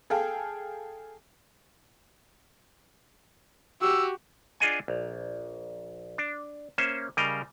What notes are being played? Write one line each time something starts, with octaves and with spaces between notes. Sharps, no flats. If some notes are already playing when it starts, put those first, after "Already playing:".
G#4 A4 F5 G5
F#4 G4 E6
D4 F4 G#4 D#5 F#5 G#5
A#1
D4
A#3 C#4 C5 E5
C#3 G3 A#4 D#5 F5